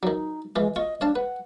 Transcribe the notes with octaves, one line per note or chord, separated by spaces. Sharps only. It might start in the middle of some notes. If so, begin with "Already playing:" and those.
D#3 F#3 D#4
E3 G#3 F4
F4 D#5 C#6
D4 C#5 F5 A5
B4 F#5